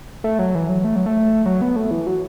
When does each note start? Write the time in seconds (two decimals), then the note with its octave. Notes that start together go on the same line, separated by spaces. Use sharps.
0.24 A3
0.39 F#3
0.55 E3
0.69 F#3
0.84 A3
0.96 F#3
1.06 A3
1.46 F#3
1.61 B3
1.76 A3
1.91 E3
2.07 F#3